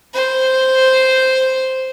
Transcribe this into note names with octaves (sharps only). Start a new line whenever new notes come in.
C5